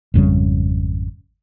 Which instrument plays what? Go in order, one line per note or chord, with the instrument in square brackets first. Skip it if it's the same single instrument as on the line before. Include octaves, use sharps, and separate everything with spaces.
[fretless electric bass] G#1 F2 C#3 G3